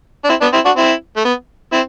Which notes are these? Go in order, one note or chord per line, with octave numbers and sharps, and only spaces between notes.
D4
C4 E4
B3 D4
C4 E4
D4 F#4
C4 E4
A3
B3
C4 E4